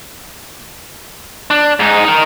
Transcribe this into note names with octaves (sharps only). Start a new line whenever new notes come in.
D4
G#2 D#4
D#4 A#4